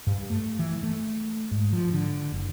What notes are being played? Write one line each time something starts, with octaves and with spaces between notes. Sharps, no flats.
G2
A3
E3
A3
G#2
F3
D3
F#1